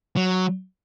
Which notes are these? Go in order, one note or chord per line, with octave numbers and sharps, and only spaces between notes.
F#3